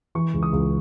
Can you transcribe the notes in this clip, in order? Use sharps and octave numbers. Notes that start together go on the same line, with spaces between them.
E3 C#6
C#2
D#6
C#2